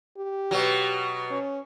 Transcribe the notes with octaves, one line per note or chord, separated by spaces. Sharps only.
G4
B2 F#3
C#4